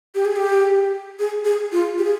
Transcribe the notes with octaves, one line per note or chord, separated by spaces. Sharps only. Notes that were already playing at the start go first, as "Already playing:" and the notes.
G4
G#4
G4
G#4
G#4
F4
G4
G#4